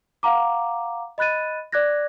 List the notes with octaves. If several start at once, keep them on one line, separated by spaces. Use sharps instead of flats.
F5 F#5 A#5 D6
D#5 B5 F#6 A6 D#7
D5 D6 F#6 G#6 A#6